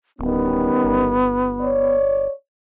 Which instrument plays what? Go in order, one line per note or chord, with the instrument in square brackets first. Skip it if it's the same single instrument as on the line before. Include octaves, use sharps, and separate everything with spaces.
[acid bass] D1 [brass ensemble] D#3 G3 C#4 [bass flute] B3
[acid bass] G1
[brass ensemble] C#5 D5